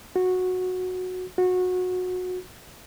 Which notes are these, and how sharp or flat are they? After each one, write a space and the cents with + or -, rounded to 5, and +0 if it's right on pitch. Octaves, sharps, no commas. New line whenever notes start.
F#4 -10
F#4 -20